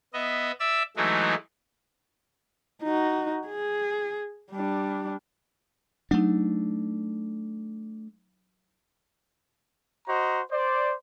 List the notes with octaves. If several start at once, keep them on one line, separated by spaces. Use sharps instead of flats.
B3 D#5 E5
D5 E5 E6
E3 F#3 G#3 A3 D#4 E4
D#4 F#4
G#4
G3 D4
F#3 A3 D4 D#4
F#4 C5 D#5 A#5
C5 D5